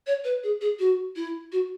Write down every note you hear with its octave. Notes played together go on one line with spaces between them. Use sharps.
C#5
B4
G#4
G#4
F#4
E4
F#4